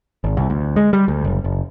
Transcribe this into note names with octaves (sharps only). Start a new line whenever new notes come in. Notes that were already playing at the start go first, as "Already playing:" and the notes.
G#1
C2
D2
G#3
G3
D2
F#1
F#1